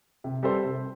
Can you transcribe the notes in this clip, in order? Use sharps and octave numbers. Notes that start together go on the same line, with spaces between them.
C3
G3 C4 A4 C5
C3